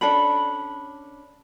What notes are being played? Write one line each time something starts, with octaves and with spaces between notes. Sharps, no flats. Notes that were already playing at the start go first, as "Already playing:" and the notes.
C#4 D4 A4 B5